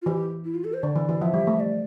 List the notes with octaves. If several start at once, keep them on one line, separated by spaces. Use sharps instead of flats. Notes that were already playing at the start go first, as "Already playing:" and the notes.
F4
E3 G4
E4
F4
A4
C5
D3 D5
E3
E3
F3 E5
G3
A3
D5